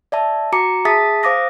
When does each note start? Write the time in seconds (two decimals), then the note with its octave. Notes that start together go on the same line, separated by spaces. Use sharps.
0.12 D5 E5 A5
0.52 F#4 A#5 D6 C#7
0.85 G#4 E5 A5 D#6 A6 B6
1.23 C5 F5 D6 D#6 A#6